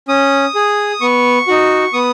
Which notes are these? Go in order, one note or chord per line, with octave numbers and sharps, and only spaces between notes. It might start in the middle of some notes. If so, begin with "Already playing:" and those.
C#4 D#6
G#4
B3 C#6
D#4 F#4
B3 D#6